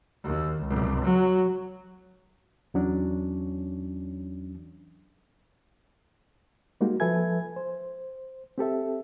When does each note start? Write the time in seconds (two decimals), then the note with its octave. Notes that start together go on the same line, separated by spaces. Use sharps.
0.24 D#2
0.61 C#2
1.04 F#3
2.74 E2 E3 F#3 C#4 D4
6.81 G3 G#3 A#3 D#4 F#4
7.00 F3 A4 B4 E5 G#5 G#6
7.56 C5
8.58 C4 G4 A4 E5